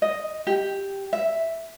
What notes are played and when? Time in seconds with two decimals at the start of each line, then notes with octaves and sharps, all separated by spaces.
0.02 D#5
0.47 G4
1.13 E5